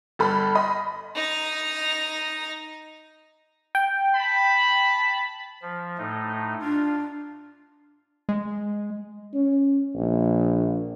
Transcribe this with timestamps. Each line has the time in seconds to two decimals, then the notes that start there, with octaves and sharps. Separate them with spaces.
0.19 G1 A4 B5 F6
0.55 D#5 B5 C6
1.16 D#4 A#5
3.75 G5
4.16 A5 B5
5.62 F3
5.98 A2 A3 D#4
6.61 D4 F4
8.29 G#3
9.34 C#4
9.95 A#1